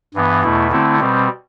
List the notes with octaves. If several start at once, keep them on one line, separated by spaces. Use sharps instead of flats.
G2 E3 B3
E2 B2 A3 E4
D3 A3 C4 E4
B2 G3 C4